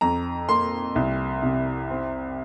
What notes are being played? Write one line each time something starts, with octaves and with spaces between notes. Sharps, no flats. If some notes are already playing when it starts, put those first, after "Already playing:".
F2 A#5
A#3 C6
C2
C3
C4